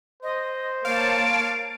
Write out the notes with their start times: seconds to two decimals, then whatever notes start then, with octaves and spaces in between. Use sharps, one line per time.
0.23 C5 D#5
0.85 A#3 C#5 F5 A5 D7